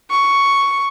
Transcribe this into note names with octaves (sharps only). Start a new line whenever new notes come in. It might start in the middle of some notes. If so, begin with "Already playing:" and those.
C#6